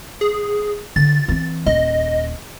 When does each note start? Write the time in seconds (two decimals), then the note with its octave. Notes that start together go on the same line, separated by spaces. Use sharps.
0.21 G#4
0.96 D3 A6
1.28 E3 C4
1.66 D#1 D#5